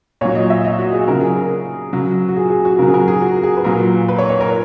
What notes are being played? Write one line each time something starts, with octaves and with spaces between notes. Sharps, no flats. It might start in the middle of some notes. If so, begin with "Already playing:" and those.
A#2 F#3 C#5
D#5
E5
D#5
F#4
G#4
C#3 F#3 A#4
G#4
A#4
C#3 F#3
F#4
G#4
G#4
F#4
C#3 F#3 A#4
G#4
A#4
G#4
F#4
G#4
B4
A#2 F#3 A#4
B4
C#5
C#5
A#4